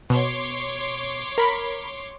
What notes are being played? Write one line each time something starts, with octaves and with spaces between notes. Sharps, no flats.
B2 C#5 C6 D6
A#4 B5